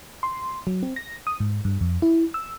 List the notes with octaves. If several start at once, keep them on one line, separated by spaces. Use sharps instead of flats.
C6
F#3
C4
A#6
D#6
G#2
G2
F2
E4
E6